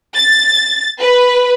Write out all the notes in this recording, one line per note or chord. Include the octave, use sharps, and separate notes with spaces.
A6
B4